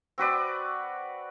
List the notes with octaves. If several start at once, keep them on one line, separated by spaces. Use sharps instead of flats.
C4 F#4 B4 D5